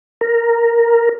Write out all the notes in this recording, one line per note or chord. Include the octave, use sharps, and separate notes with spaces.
A#4